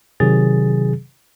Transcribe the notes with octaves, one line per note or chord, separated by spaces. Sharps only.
C3 D#3 F#3 G#4 A6